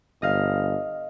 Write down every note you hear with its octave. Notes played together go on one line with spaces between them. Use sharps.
G1 D#5 F5